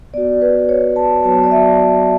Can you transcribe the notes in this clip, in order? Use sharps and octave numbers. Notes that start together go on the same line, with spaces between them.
B3 F#4 D5
B4
C#5
A5
F#3 B3 F#4 A5
D5
E5